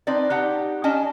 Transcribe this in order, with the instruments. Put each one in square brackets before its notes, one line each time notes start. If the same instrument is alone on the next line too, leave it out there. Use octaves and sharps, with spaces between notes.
[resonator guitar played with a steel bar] C4 D#4 B4 D5
D#4 G4 F#5
C#4 D4 D#5 G#5 A5